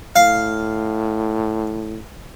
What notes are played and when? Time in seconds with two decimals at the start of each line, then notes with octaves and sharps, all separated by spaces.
0.16 A2 F5